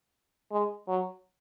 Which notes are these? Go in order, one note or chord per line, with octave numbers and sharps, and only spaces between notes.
G#3
F#3